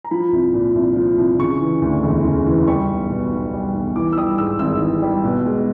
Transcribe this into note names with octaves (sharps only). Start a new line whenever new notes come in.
A#5
F3 B5
C2
A#2
C2
F3
C2
C#3 C#6
E3
D2
E1
C#3
E3
G3 C#6
B1
B2
B1
G3
B1
E3 D6
E6
G3 D#6
G#2 E6
G#1 E6
E3
G3
B2
G#3